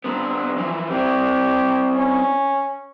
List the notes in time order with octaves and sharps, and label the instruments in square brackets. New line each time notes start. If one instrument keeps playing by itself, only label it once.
[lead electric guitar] D3 B3 [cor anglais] C4
[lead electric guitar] E3 F3
[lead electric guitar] C4 E4 [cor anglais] G4
[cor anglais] C#4